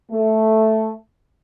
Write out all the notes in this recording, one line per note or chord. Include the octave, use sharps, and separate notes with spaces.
A3